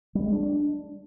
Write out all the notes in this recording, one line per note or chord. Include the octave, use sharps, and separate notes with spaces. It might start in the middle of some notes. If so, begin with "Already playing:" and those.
G3
G#3
D4